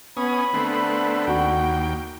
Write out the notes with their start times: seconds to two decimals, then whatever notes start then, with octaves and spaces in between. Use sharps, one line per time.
0.17 B3 C#4 G#5 B5 D#6
0.54 D3 A3 B3 C4
1.27 D#2 F#4 G5